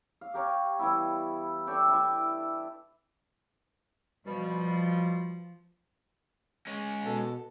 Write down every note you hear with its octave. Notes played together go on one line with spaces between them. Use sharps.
F5
G4 A#4 C#5
E3 G3 B3 E4
A4 D5 E5 G5
D4 E4 E5
B2 F3 G3
G#3 C#4
B2 A4